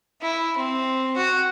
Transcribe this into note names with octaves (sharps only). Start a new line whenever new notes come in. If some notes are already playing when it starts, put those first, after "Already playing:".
E4
C4
F#4